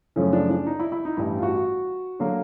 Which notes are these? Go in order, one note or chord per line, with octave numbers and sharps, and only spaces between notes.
F#2 C#3 F3 A3 C#4
D4
D4
D#4
E4
E4
D#4
A1 G2 E3 E4
F4
F#4
D3 F#3 A#3